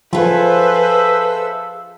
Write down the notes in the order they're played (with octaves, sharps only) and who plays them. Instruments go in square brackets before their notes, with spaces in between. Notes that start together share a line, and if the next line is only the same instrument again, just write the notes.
[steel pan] F3 [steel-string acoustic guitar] F4 G#4 [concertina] A4 E5 [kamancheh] B4 C5